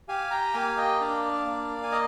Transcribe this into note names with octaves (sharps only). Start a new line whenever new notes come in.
G4 F5 G#5
G5 A#5
A#3 F5 G#5
D#5 G5
D4 D5 F5
A#3
G#5
D#5